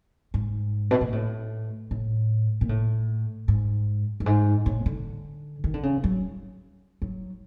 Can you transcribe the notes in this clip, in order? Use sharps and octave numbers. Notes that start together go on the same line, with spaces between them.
G#2
B2
A#2
A2
A2
A#2
A2
G#2
G2
G#2
A2
D3
D#3
D3
C#3
F#3
F#3